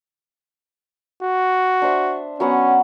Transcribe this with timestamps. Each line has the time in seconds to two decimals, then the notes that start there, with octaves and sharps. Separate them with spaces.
1.23 F#4
1.82 D4 C5 E5
2.40 F#3 B3 C#4 F#5